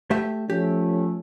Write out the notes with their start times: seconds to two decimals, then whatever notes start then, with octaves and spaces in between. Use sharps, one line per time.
0.11 A3 G4 E5
0.50 F3 A3 C#4 G4